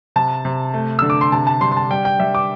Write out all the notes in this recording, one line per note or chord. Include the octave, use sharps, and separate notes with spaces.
C3 A5
C3
A3
D3 E6
D6
C6
C3 A5
A5
G3 C6
C6
A5
G3 G5
G5
G3 E5
D6